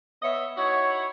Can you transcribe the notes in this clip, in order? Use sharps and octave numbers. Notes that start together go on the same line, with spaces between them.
B3 C#5 D#5 E5
D#4 E4 F#4 C#5